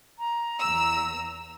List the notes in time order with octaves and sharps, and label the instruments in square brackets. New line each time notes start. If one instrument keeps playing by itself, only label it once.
[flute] A#5
[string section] E2 E6